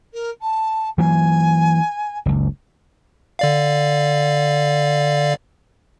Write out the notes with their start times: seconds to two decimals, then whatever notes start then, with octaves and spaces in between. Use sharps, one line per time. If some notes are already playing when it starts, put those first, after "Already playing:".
0.13 A#4
0.41 A5
0.98 E3 F#3 A#3 G#5
2.26 F#1 C#2
3.39 D3 D5 F5